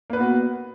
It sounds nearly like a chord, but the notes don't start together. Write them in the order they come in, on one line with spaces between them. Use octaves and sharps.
A#3 B4 B3 F#4